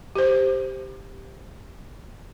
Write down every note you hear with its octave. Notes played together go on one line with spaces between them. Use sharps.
G4 C5